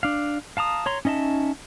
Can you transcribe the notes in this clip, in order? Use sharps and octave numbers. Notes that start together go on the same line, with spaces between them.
D4 F5
F5 A5 A#5 D#6
C#5 A#5 C6
C#4 D#4 D#5 E5 A5